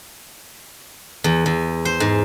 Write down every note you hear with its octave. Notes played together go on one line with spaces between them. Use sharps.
E2
E2
C5
G#2